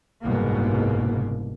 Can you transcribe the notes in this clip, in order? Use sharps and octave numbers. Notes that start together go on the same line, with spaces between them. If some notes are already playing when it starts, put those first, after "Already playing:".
F#1 C2 G#2 B2 A#3